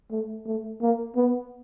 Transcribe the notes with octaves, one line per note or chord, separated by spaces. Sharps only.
A3
A3
A#3
B3